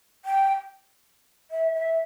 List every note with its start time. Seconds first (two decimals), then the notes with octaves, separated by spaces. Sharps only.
0.25 G5
1.51 E5
1.75 E5